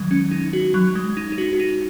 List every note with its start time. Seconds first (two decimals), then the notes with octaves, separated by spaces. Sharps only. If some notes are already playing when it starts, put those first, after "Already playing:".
Already playing: D#3 F#3 G#3
0.11 C#4
0.31 D#4
0.53 F#4
0.74 F#3
0.95 G#3
1.17 D#4
1.32 D#4
1.38 F#4
1.53 F#4
1.60 D#4